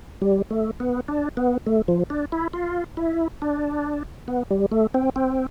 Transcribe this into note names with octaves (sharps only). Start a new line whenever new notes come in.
G3
A3
B3
D4
B3
A3
F3
D4
E4
F4
E4
D4
B3
G3
A3
C4
C4